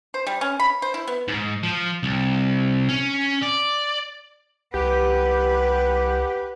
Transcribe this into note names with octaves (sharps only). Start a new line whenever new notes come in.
C5
G3
C#4
B5
C5
E4
B3
G#2
F3
C2
C#4
D5
C2 G4 B4 F#5